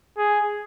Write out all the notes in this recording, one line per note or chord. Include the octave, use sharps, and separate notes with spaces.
G#4